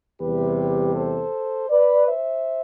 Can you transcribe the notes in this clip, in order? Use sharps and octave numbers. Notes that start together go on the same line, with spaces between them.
E2 C3 G3 G4 B4
A4 C5
B4 D5
C5 E5